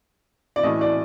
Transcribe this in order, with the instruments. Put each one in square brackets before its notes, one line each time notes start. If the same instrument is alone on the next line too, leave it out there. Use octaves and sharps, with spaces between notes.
[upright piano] D5
[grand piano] A2 E3 A3 C#4 [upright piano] D#5
[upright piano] D5